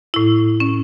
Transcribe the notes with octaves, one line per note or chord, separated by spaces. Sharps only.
A2 E4
C#4